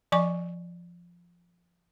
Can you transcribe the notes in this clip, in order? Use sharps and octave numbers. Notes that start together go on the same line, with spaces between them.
F3 D5 G#5 C#6